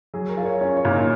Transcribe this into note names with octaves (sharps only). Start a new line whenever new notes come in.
F#3 G#4
A#4
F4
C#5
C#4 C#5
C#5
A#2
D#4